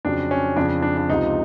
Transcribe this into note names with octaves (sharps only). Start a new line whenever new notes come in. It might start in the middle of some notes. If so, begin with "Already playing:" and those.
F2 C#3 F#3 D4
C#4
F2 C#3 F3 D4
D4
D4
C#2 C3 F3 D#4